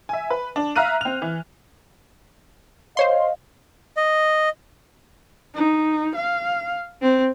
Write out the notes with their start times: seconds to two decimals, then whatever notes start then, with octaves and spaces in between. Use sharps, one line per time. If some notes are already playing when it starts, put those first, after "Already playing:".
0.09 E5 G#5
0.30 B4
0.56 D4
0.76 E5 F5 A#5 F6 F#6 D#7
1.01 C4 F7
1.22 E3
2.97 C5 C#5 D#5 F5 C6
3.97 D#5
5.55 D#4
6.15 F5
7.01 C4